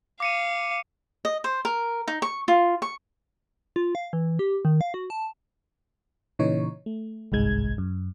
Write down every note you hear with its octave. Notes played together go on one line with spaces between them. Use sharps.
F5 D6 C#7 D#7
D#5
C5
A#4
D#4
C#6
F4
C#6
F4
F5
E3
G4
D#3
F5
F#4
A5
A#2 C#3 E3 D#4 C#5
A3
G1 C2 G#2 G#3 G#6
F#2